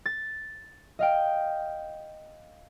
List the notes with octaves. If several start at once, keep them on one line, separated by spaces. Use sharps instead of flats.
A6
D#5 F5 G5